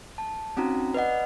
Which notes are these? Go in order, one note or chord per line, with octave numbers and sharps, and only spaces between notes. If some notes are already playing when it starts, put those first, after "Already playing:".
A5
C4 C#4 D#4 F#4 A#5
B4 D5 D#5 F#5